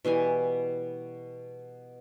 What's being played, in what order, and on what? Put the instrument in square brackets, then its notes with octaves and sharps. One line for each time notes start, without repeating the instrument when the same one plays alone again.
[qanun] B2 E3 G3 G#5